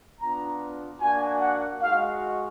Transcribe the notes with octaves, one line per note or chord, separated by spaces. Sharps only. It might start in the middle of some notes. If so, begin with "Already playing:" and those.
B3 D4 F4 A#5
A#3 D4 F#4 G#5
F#5
G#3 D#4 F#4 F5